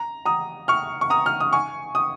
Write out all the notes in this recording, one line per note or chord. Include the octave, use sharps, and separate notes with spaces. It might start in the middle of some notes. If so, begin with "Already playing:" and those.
Already playing: A#5
A#5 D#6
C#6 F6
C#6
A#5 D#6
F6
D#6
G#5 C#6
D#6